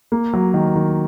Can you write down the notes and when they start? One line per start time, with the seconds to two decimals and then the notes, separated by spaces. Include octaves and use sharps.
0.12 A#3
0.33 F#3
0.54 D#3
0.76 D#3